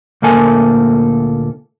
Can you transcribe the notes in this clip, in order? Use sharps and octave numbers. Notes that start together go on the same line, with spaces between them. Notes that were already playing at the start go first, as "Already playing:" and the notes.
D2 A#2 A#3 A4 G#5